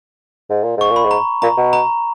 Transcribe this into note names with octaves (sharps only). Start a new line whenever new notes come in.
G#2
A#2
G#2 C#6
A#2
B5
G#2
A#5
A#2 A#5
B2
A#5